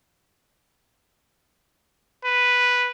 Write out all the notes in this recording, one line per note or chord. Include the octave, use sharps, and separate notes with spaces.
B4